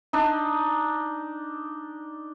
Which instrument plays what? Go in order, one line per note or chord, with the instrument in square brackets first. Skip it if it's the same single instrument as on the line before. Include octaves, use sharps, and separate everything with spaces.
[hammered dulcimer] D4 D#4